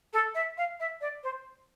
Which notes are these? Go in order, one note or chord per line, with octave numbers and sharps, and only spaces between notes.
A4
E5
F5
E5
D5
C5